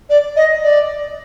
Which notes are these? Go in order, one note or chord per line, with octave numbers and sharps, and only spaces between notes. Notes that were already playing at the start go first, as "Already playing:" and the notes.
D5
D#5
D5